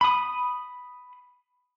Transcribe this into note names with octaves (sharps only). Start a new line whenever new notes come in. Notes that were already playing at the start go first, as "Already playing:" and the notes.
B5 D#6